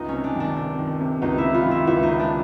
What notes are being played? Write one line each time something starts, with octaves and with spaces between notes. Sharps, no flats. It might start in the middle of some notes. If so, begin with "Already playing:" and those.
Already playing: C#2 D#4
C3 C#4
D4
D#3 D4
C3
D#3
C3
C#2 D#4
E4
C3
F4
D#3
E4
C#2 E4
D#4
C#2
D4